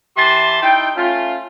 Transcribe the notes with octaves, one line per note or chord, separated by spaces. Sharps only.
E3 G4 A5 C6
D#4 E4 G5
A3 C#4 F4